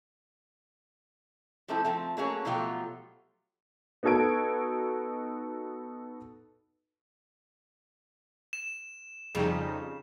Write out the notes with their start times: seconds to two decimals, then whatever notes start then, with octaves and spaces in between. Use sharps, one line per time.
1.68 F3 G3 A3 C4 E4
1.85 F3 A3 C4
2.17 F#3 A3 A#3 C#4 G#4 C#5
2.45 B2 F3 F#3 A3 F4 G4
4.03 B3 D#4 F#4 A4 G#6 D7
8.53 E7
9.35 F2 C#3 G3 D#4